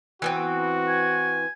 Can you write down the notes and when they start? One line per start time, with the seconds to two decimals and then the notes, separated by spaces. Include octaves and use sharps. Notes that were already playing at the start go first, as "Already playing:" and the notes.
0.22 E3 B3 C4 F#4
0.88 G#5